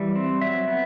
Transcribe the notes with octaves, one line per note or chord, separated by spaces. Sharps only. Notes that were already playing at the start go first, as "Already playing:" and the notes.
Already playing: E3 G3
C4
F#3 E5
B3